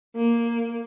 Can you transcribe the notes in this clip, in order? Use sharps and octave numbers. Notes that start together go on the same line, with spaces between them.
A#3